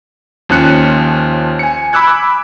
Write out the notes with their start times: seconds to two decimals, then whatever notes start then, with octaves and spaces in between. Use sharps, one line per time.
0.49 D#2 F3 C#4 F#6 C#7
1.59 G#5 C#7
1.93 B5 D6 E6 F#6 G#6